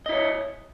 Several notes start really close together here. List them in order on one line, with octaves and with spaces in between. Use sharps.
D#5 E4 C#5